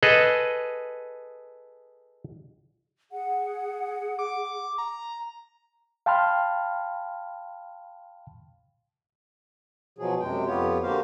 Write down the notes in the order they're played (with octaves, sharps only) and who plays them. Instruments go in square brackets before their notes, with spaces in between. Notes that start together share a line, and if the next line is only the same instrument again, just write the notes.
[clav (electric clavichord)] G#4 A4 B4 D#5
[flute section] G#4 F#5
[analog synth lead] D6
A#5
[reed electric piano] F5 G5 A5 B5 C6 F6
[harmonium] B2 F3 F#3 G#4
F#2 C3 G#3 G5
F2 B3 F4 G4 C#5
D3 A#3 F#4 G4 C5 F5